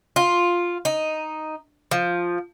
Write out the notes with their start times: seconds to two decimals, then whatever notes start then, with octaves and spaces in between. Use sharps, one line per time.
0.16 F4
0.85 D#4
1.91 F3